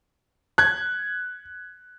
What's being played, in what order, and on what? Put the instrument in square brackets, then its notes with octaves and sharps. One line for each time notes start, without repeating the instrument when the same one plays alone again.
[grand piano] F#6 G#6